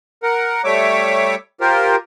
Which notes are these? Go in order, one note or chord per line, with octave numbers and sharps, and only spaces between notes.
A#4 F#5
G3 A3 C#5 E5 D6
F4 G4 A#4 C5